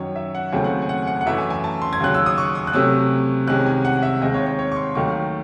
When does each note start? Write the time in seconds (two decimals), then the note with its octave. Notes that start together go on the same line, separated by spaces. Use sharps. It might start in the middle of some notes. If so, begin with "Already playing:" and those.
Already playing: F#2 D#3 F#3 C#5
0.16 E5
0.35 F#5
0.52 D#2 C#3 F#3 A3 C4 G#5
0.64 F#5
0.82 G#5
0.89 F#5
1.07 F#5
1.21 F#5
1.26 F#2 E3 A3 E5
1.38 G#5
1.50 G#5
1.64 A5
1.82 C6
1.93 G#6
2.00 D#2 C#3 F#3 F#6
2.14 E6
2.26 D#6
2.38 C#6
2.55 D#6
2.67 F#6
2.73 C3 F#3 A3 C#4 E6
3.47 C2 C3 D#3 G#3 C#4 F#6
3.66 G#5
3.85 F#5
3.97 F#5
4.03 E5
4.21 D#2 D#3 G#3 C4 D#5
4.34 C#5
4.47 C#5
4.59 C#5
4.72 C#6
4.76 C6
4.95 D#2 D#3 F#3 A3 C#6